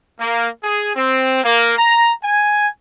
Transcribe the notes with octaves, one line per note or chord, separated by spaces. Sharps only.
A#3
G#4
C4
A#3
A#5
G#5